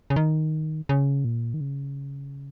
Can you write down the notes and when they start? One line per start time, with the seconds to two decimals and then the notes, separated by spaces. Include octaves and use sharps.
0.10 C#3
0.16 D#3
0.89 C#3
1.25 A#2
1.54 D#3
1.61 C#3